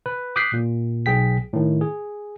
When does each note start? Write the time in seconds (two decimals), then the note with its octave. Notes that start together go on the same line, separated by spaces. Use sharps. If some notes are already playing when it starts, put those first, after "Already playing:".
0.06 B4
0.36 D6 D#6 F#6 G6 B6 C7
0.53 A#2
1.06 B1 G#4 G5 B6
1.53 A2 D#3
1.81 G#4